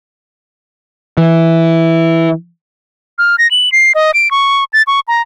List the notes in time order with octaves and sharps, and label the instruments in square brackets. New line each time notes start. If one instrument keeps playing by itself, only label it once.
[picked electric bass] E3
[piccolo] F6
A#6
F#7
C7
D#5
D7
C#6
A6
C#6
A#5